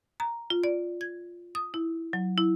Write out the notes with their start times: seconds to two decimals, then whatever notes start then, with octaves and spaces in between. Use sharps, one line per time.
0.20 A#5
0.50 F4
0.64 D5
1.01 G#6
1.55 D#6
1.74 E4
2.13 F#3
2.38 E4